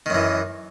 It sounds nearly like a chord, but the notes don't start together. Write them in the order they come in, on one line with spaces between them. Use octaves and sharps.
D#3 F#2 E3